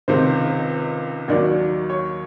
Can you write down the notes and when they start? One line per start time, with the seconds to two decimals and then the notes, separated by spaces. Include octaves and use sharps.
0.08 C#2 C3 D#3 C5
1.28 D#2 D#3 F#3 D5
1.90 C#5